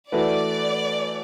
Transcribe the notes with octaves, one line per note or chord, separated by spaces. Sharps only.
E3 A3 F#4 B4 D5